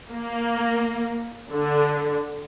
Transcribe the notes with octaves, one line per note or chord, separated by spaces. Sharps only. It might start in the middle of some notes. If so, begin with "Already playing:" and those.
A#3
D3